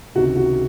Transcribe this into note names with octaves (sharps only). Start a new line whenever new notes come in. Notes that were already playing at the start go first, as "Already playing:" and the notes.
C#2 C3 D#3 F#4
F#4